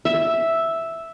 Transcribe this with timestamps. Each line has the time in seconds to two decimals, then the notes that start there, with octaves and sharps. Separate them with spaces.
0.05 E5